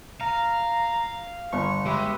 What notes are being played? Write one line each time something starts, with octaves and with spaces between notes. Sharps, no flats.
F5 A#5
G1 C#6
G#3 G4 B4 E5